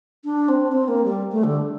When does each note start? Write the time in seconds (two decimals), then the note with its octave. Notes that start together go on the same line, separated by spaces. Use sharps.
0.24 D4
0.49 C4
0.72 C4
0.88 A#3
1.04 G3
1.32 A3
1.44 D3